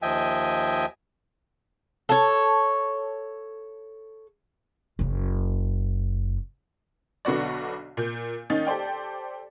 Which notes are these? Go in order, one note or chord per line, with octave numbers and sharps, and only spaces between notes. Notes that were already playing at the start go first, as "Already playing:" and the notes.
D#2 F3 D#5 E5 G5 G#5
A4 C#5
F#1 C#3
B1 D3 B3 F#4 D5
A#2 G6
D#3 A#3 C#4 D#4 A6
G4 A4 C5 D5 G5